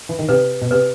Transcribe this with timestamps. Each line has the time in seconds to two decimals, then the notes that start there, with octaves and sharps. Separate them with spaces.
0.09 E3
0.19 D#3
0.29 C3 B4
0.62 B2
0.71 C3 B4